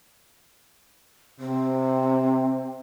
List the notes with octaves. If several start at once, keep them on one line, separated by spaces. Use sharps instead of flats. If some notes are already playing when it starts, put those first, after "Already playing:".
C3 C4